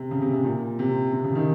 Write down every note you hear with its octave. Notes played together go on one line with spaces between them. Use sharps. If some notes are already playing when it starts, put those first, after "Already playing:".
Already playing: C3
C#3
C3
C3
A#2
C3
C3
C#3
D#3